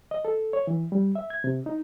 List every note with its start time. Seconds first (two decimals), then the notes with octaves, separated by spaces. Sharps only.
0.11 D#5
0.25 A4
0.53 C#5
0.67 E3
0.92 G3
1.15 E5
1.30 G#6
1.44 C3
1.66 D#4